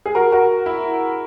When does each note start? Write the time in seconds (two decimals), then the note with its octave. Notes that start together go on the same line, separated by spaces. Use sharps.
0.06 G#4
0.15 F#4 A#4
0.32 F#4 A#4
0.66 E4